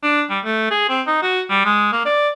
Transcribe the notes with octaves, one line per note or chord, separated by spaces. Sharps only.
D4
G3
A3
G#4
C4
D#4
F#4
G3
G#3
A#3
D5